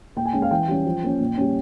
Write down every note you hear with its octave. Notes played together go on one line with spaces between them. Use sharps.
A#2 G5
G#5
G#3 C#4 G5
F5
E3 G5
G3 C#4
F3
A#3 C#4
A#2
G3 C#4